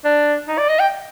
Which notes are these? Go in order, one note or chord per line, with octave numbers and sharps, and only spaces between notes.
D4
D#4
D5
D#5
G5